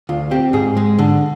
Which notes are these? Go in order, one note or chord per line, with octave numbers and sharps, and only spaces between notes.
D2 F4
C4 G4
G#2 G#4
G#3
D3